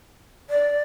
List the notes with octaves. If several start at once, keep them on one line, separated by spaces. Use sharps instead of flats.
D5